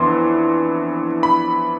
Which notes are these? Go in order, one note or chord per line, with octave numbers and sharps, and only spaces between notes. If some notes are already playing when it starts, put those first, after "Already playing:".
Already playing: F2 E3 B3 D4 C6
B5